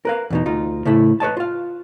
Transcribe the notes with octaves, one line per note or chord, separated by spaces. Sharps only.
A#4 B4 F5
E2 B2 D#4
D2 D#4 F4
A2 C#3 A3 E4
B4 C#5 D#5 A5
F4 F5